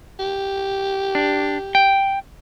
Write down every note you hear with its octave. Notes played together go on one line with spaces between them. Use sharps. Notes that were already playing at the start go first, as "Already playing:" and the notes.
G4
D4
G5